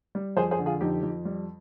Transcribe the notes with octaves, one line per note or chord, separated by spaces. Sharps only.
G3
F2 G#4 C5
G#4 C5
D3
F4 G#4
F2 D#4 G4
F2
G3